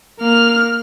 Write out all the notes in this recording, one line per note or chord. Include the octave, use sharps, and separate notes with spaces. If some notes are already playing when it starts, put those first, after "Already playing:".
A#3 F6